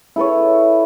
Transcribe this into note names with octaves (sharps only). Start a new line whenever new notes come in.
E4 A4 B4 C#5